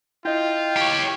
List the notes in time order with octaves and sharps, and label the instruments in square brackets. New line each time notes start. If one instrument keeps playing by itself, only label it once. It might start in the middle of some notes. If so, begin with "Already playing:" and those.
[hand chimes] E4 D#5 [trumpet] F4 [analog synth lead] G5
[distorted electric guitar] G4 C#5